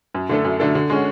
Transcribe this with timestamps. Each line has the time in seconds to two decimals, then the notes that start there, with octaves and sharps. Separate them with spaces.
0.14 F#2
0.29 D3 A3 D4 A4
0.45 F#2
0.60 D3 A3 D4 A4
0.75 D3
0.90 G#3 C#4 F#4